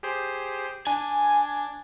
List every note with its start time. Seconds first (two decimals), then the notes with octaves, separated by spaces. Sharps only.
0.03 G4 G#4 C5
0.87 D4 G#5